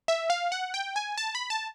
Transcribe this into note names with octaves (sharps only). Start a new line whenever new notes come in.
E5
F5
F#5
G5
G#5
A5
B5
A5